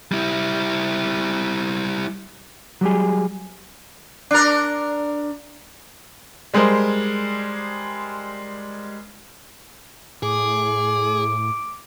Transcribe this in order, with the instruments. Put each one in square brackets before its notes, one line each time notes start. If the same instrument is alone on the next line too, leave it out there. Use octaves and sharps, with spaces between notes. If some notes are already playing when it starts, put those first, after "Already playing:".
[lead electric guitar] G3 E4
[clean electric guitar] F#3 G3 G#4
[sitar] D4 A#4
[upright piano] G3 G#3 G#4 A#4 C5
[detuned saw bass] A2 [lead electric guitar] G#4 [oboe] D6